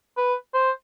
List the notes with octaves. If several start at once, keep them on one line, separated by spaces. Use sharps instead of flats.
B4
C5